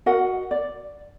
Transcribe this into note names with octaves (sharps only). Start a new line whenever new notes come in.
F#4 A#4 D#5 F#5
D5